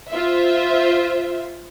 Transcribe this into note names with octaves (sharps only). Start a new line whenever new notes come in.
F4 C5 E5